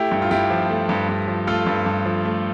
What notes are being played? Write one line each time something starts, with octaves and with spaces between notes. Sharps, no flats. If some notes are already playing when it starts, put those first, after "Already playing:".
Already playing: A3 E4 G4
G2
F4
G2 E4 G4
F3
A3
G2
G2
F3
A3 F4 A4
G2
G2
F3
A3